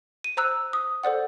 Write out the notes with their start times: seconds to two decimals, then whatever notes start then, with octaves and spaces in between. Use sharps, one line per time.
0.24 D#7
0.37 C5 A#5 E6 F#6
0.73 D#6
1.03 A4 C5 D5 F#5